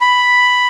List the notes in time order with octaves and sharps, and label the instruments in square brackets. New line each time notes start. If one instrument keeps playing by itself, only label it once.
[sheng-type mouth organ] B5